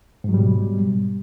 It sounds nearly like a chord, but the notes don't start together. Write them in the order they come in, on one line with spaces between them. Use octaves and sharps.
G#2 F#3 G3 B2